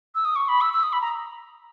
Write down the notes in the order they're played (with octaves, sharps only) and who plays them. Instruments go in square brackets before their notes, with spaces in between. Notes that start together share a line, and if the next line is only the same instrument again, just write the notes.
[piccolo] E6
D#6
C#6
B5
E6
E6
D#6
B5
A#5